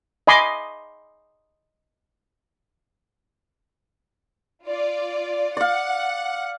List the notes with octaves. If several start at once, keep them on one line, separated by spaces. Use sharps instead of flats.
D#5 G#5 B5 C6 D6
F4 D5
D5 F5 F#5